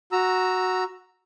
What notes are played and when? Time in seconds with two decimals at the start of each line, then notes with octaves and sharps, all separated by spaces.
0.12 F#4 A#5 E6